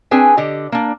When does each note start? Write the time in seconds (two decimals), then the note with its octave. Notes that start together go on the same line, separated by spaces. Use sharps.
0.11 C4 D4 G#4 B4 G#5
0.37 D3 G4 D#5
0.72 A#3 D4